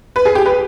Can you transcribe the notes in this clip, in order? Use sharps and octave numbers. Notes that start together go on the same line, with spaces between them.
B4
G#4
G4
B4